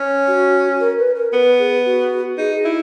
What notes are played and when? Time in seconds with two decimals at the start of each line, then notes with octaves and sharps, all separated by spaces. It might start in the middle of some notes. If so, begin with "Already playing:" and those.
Already playing: C#4
0.28 F#4
0.80 A#4
0.99 B4
1.15 A#4
1.32 B3 B4
1.59 G#4
1.86 F#4
2.38 D#4 G#4
2.56 G#4
2.65 E4